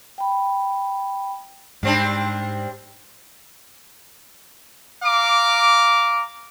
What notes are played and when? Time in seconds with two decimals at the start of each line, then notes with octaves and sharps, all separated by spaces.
0.18 G5 B5
1.83 G#2 G3 C4 D4
5.04 F5 A#5 D6